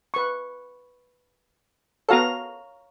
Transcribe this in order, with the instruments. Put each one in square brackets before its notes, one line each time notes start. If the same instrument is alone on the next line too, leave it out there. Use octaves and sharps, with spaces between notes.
[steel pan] B4 C#6
[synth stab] B3 F#4 A4 [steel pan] C#5 F5 A#5